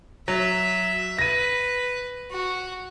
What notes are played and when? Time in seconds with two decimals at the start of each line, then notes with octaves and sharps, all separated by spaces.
0.28 F#3 E5
1.18 B4 A#6 D#7
2.30 F#4